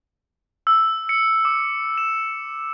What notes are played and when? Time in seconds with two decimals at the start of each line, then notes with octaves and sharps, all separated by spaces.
0.67 E6
1.09 C#7
1.45 D6
1.98 E7